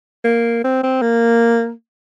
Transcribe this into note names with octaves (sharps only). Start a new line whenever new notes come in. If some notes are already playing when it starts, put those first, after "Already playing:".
A#3
C4
C4
A#3